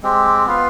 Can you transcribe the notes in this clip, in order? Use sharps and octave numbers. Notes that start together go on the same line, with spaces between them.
G#3 C4 G4
B3 F4 B4 F5